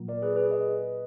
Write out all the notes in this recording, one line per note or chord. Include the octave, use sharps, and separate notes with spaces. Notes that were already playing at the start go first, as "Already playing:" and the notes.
Already playing: A#2 F#3 A#3 F4
A#4 D5
G#4 B4
G#4 B4
B4 D#5